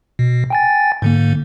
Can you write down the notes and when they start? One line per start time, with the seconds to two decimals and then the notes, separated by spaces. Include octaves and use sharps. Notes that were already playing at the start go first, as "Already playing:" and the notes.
0.19 B2
0.50 G5 G#5 A6
1.02 G#2 D3 A#3